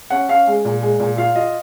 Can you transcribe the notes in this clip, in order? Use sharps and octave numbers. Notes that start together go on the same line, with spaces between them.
C#4 F#5
C#4 F5
G#3
A#2
G#3
A#2
F4 F5
F4 D#5